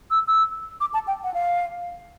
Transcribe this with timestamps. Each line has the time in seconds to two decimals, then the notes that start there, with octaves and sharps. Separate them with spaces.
0.11 E6
0.27 E6
0.81 D6
0.94 A5
1.07 G5
1.24 F#5
1.34 F5